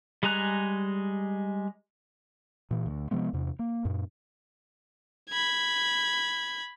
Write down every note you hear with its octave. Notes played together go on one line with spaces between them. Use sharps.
G3 G#3 G#4 A#5 F#6
A#2 E3
D2
C3 F3 G#3 B3
E2 C3
A#3
F#2 A#2
B5 G#6